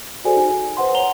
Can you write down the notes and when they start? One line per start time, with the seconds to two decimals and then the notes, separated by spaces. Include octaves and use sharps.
0.25 F#4 G#4 A4 C5 D5 G#5
0.37 D#4 G#5
0.50 G#5
0.77 B4 C5 F#5 C6
0.94 C#5 F#5 A#5 F7 G7